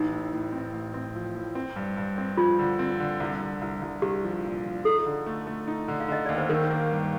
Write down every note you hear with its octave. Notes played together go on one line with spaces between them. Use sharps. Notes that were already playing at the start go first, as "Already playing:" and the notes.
Already playing: A1 D#4
A2
A2
C4
A1
C4
F3
A2
C4
G2
G2
C4
F3 F4
D3
C4
D3
C2
C2
C2
C2
C2 G4
F3
A#2
F3
D#4 A4
D3
A3
A3
D#4
D3
F5
D3 D#5
D#2 D5
C5
D#3 A#4
A#3
G2